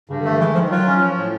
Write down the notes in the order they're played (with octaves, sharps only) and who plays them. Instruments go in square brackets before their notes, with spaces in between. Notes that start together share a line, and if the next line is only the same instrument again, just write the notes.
[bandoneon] G2 [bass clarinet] C#3
[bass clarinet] D3
[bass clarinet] D#3 [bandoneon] A3
[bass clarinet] D#3
[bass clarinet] E3 [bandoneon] G#3
[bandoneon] D#3 [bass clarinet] F3
[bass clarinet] F#3 [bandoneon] F4
[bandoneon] C#4
F3
A2